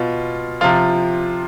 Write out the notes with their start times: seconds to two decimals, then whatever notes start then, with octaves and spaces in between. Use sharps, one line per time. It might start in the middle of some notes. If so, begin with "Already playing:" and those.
Already playing: B2 F4
0.61 F3 F4
0.64 C3